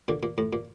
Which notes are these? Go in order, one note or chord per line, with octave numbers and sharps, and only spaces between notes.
A#2 D3
A#2
A2
A#2